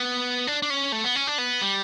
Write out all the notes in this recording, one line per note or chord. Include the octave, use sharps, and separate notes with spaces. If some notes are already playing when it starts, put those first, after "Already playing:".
Already playing: B3
D4
D4
C#4
A3
B3
C#4
D4
B3
G3